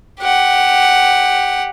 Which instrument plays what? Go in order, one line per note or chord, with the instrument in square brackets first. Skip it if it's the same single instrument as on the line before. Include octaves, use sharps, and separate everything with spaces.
[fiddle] G4 F#5